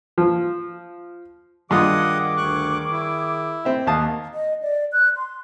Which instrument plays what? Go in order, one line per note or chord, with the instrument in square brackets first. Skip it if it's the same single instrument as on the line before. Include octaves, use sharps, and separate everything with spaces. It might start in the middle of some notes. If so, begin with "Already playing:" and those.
[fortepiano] F3
[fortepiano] G2 F4 D#6 [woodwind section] D#3 G#4 D6 [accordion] D#5 F#5
[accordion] D2 C#6 F#6
E4
[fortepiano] C4 E5
[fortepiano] D#2 A5 D#6 [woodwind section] A#4 F5 F#5
[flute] D#5
D5
F#6
C6